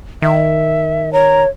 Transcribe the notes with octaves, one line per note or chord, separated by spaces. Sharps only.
D#3 E5
C#5 A#5